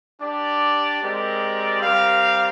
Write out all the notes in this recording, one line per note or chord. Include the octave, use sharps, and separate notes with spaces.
D4 G4 D5
G#3 C4 G4 A#4 D5
G3 C4 G4 A#4 F5